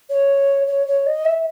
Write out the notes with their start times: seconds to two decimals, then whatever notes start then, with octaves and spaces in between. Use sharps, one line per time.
0.09 C#5
0.67 C#5
0.87 C#5
1.06 D#5
1.25 E5